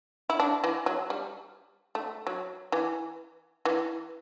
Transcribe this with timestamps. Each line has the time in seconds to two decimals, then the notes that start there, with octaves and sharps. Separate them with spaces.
0.30 E4
0.40 D4
0.64 E3
0.86 F#3
1.10 G3
1.95 A3
2.27 F#3
2.72 E3
3.65 E3